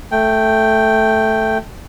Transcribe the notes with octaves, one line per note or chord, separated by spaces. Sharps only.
A3 G5